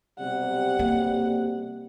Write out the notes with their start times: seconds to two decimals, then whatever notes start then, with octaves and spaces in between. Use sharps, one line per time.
0.20 B1 C3 G3 F#5
0.79 C3 A#3